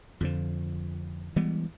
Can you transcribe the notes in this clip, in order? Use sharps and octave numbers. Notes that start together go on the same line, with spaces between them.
F2 D3 F3
E3 G3 G#3 B3